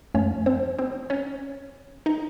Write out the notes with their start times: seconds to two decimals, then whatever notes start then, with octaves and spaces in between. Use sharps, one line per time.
0.15 F#2 F3 A3 C#4 C#5
0.46 C4 C5
0.79 C4 C5
1.10 C#4 C#5
2.06 D#4 D#5